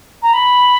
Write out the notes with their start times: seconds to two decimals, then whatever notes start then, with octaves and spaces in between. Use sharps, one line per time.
0.22 A#5
0.33 B5